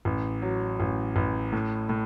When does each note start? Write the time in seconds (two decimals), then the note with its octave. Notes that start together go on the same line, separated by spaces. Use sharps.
0.05 A1
0.42 F#3
0.80 A1
1.16 A1
1.52 A2
1.89 A2